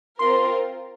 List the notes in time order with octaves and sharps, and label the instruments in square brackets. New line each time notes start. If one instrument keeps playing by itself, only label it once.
[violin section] C4 F4 A#4 [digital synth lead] C6